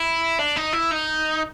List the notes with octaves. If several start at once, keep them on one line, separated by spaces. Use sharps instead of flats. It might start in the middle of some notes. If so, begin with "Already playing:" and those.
Already playing: E4
D4
D#4
E4
D#4